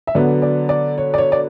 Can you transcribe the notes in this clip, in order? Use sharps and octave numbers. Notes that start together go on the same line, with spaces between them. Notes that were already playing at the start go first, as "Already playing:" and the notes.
E5
D3 F#3 B3 D5
D5
D5
C#5
D5
C#5
D5